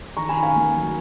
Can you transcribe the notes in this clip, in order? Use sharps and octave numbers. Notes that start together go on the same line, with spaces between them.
D#3 A#5 C#6
G#5 B5
D#3
F5 G#5
A#3
F#3